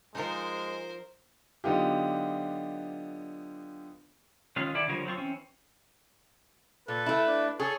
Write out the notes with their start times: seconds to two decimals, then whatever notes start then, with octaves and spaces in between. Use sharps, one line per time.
0.15 F3 G#3 D#4 A#4 C5
1.64 D3 F#3 B3 D#4 F4 G4
4.56 D#3 G#3 C#4 F4 F5
4.74 D#3 E4 A4 D5
4.88 D3 F3 G3 A#4 C#5
5.05 F#3 C4 F4 C#6
5.17 E3 C4 C#4
6.88 A#2 A4 B4
7.06 A3 E4
7.27 D4
7.60 G#4 A4 C#5